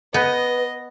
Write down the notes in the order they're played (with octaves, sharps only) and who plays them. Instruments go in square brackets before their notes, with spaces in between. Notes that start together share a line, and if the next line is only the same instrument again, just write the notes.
[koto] B3 [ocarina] B4 [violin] D#5